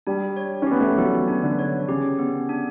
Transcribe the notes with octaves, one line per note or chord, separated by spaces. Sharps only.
G3 D4
C#5
C#4
B3 G4
A3
G3
F#3 B3
D4
D3
C#5
C#3 G4
B3
D4